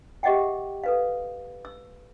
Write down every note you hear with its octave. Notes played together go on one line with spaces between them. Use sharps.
G4 G#4 D#5 E5 F#5 G5
A4 B4 F5
E6